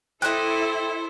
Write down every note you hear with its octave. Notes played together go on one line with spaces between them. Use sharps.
E4 G4 A4 C5 D#5 F#6